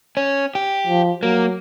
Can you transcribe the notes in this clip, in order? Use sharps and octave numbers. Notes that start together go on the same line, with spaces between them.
C#4
G4
F3
F#3 A#3